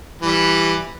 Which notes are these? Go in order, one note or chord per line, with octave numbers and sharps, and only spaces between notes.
E3 G3